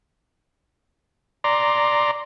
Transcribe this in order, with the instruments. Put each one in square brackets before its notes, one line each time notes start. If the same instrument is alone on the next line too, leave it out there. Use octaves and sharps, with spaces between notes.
[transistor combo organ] D5 A#5 C6